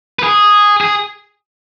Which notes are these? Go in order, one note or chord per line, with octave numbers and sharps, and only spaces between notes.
B4
G#4
G#4